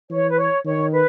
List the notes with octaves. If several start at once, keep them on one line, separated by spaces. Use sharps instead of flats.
E3 C#5
B4
C#5
D#3 C#5
B4